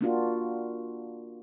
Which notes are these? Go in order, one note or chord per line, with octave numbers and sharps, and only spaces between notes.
A#3 D4 F4 F#4